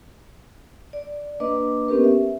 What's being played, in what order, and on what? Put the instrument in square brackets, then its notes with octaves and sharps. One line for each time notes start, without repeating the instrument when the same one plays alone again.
[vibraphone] D5
A#3 D4 B4 D#5 D6
B3 C#4 G4 A#4 B4
E5